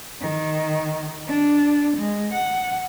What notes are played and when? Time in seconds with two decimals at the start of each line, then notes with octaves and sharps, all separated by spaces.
0.21 D#3
1.27 D4
1.97 G#3
2.33 F#5